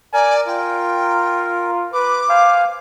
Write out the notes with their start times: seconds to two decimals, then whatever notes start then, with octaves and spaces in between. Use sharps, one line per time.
0.13 A#4 D5 G#5
0.48 F4 G5
1.93 B4 D6
2.29 C5 F5 G#5